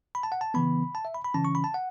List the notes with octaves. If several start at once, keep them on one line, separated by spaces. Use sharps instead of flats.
B5
A5
F#5
A5
C#3 E3 B3 B5
A5
E5
B5
B5
C#3 E3 C#4 A5
C#6
B5
A5
F#5